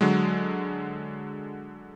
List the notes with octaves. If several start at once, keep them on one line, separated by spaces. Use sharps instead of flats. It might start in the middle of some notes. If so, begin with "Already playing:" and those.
D3 F#3 G#3